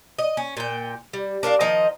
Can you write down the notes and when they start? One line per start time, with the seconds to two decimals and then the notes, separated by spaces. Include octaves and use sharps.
0.18 D#5
0.37 C#4
0.57 A#2 G5
1.13 G3
1.43 D4 A#4 B4 F5
1.60 D#3 F3 D#5 A#5